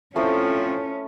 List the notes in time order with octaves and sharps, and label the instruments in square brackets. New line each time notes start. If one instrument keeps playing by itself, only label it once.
[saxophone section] F2 A2 F3 [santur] A3 E4 E6 [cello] C#4